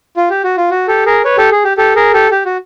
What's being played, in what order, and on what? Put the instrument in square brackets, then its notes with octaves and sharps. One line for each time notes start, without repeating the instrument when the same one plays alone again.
[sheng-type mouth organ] F4
G4
F#4
F4
F#4
G4 A4
G#4 A#4
B4 C#5
G4 A4
G#4
G4
G4 A4
G#4 A#4
G4 A4
G4
F#4